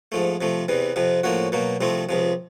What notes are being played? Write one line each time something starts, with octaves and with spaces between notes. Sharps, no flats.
G#2 F3 A3
C3 F3 A3
E2 C3 E3
F2 C3 F3
A2 F3 A#3 C#4 F#4
B2 F#3 A#3
C2 C3 F3 A3 C4
C#2 C3 F3